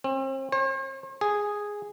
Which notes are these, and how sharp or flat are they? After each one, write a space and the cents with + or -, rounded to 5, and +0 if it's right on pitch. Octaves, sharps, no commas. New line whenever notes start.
C4 +40
C5 +45
G#4 -5